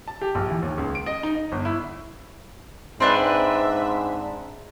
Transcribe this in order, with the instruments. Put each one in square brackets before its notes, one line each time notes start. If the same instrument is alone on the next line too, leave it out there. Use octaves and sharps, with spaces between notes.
[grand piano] A5
G4
A#1
E3
D#2
C#2
D7
D#5
D#4
D#5
G1
E4
[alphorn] G#2 [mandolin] C4 D4 B4 [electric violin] E5